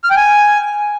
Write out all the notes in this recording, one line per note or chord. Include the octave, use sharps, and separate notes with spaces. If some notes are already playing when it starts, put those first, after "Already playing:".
F6
G5
G#5